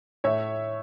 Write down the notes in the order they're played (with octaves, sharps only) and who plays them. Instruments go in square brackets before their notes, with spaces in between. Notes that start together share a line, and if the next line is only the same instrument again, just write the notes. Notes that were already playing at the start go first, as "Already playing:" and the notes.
[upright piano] A2 C#5 E5